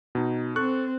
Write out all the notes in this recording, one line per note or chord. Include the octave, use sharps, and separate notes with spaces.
B2 D#4
C4 A4 C#6 F#6